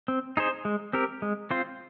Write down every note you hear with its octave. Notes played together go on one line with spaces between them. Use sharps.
C4
D#4 G#4 C5
G#3
C4 G4 A#4
G#3
C4 F4 C5